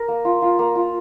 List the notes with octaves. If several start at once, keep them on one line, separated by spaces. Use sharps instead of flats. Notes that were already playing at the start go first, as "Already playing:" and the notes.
Already playing: A#4
A#3
F4
F4
A#3
F4